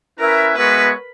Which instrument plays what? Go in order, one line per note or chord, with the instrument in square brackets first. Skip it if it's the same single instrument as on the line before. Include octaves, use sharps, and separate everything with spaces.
[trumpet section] C#4 E4 B4 E5 [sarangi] A#4
[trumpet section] G#3 B3 F#4 C#5 E5 [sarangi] B4